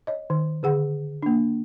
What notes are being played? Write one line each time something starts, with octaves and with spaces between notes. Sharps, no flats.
C#5 D#5
D#3
D3 G#4 F#5
A#3 D4